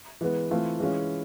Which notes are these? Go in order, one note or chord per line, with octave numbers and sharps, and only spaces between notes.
E3 G#3 B3
E3 A3 C4 F4
E3 G#3 C#4 F4